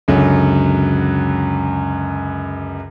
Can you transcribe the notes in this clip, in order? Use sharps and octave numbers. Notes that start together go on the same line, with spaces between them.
C#2 F#2 D3 F#3